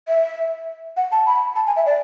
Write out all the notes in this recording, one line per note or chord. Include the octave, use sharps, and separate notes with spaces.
E5
F#5
A5
B5
A5
G#5
E5
D5